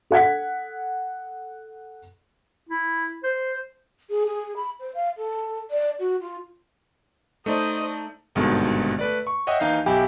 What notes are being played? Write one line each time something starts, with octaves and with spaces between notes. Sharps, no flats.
A4 F#5 G#6 B6
E4
C5
G#4
G#4
B5
C5
F5
A4
D5
F#4
F4
A3 D#4 C5 D5 D#5
G#1 G2 B2 D3 D#3 G#3
A3 B4 D5
C#6
C#5 D#5 E5 F#5 G5 D#6
D#2 E3 D#4 F5 G6 C7
B1 G4 E5 G5 G#5 B5